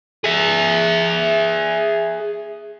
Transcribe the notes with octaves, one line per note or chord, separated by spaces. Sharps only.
G#4 E5